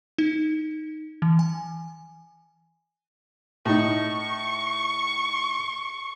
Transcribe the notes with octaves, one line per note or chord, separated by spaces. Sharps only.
D#4
E3
G#5
A2 D#4 C#6